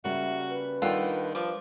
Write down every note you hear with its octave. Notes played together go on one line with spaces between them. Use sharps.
C#3 G3 A#3 F#4 E5
B4
D#3 G3 D4 F4 G4 A4 F#5
F3 B4 D6